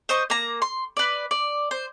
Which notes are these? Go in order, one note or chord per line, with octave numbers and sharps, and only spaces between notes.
C5 D#5 C#6
A#3 A#5
C6
B4 D5
D5
C5